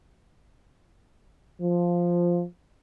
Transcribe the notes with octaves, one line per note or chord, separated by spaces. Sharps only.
F3